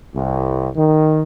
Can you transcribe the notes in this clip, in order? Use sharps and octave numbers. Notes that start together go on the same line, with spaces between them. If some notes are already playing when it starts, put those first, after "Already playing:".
C2
D#3